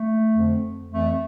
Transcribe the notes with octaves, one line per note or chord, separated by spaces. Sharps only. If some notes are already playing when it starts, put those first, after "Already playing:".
Already playing: A3
F2 D3 F3
F2 E3 A3